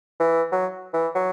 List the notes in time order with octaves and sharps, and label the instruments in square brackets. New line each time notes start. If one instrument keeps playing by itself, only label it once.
[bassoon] E3
F#3
E3
F#3